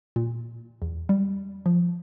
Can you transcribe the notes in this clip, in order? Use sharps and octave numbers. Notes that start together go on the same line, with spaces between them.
A#2
E2
G3
F3